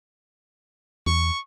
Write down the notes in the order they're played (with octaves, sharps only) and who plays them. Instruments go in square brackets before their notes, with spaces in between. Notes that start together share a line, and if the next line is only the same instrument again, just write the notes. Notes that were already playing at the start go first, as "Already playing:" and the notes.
[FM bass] E2 [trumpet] C#6